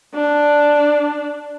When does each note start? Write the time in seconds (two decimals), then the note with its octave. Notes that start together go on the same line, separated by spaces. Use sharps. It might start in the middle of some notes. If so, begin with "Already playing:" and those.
0.15 D4